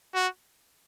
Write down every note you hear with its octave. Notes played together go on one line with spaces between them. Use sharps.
F#4